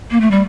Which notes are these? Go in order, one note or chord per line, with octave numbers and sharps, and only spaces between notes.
A#3
A3
G3